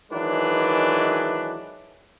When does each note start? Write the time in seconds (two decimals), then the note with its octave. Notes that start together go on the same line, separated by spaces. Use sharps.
0.12 D#3 E3 F#3 G#3 D4 B4